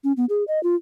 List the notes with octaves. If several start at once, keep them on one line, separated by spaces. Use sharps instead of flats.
C#4
B3
G#4
D#5
F4